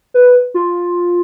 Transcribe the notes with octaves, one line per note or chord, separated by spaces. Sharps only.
B4
F4